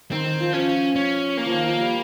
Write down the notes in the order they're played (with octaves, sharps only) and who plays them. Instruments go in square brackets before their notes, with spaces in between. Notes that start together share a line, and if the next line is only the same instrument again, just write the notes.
[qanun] D#3 [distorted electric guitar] C4
[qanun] D#3
F3
[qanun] F3 [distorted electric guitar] C#4
[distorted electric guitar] C#4
A#3
[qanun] F3
D#3
F3
G3